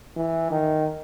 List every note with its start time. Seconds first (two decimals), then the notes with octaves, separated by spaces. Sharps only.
0.16 E3
0.51 D#3